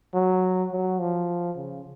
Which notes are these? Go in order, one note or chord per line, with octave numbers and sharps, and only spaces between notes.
F#3
F#3
F3
C#3